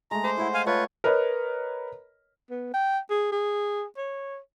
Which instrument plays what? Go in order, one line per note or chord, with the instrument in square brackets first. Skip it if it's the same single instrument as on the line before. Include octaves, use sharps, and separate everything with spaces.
[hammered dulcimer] G#3 A3 [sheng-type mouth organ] A#5
[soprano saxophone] C5 [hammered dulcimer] D6
[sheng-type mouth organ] E4 [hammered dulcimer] C#5 D#5 F#5
[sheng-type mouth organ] F5 G#5
[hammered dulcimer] A3 [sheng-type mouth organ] F4 B4 [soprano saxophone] C#5
[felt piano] A#4 B4 C#5 D#5
[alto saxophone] B3
G5
G#4
G#4
C#5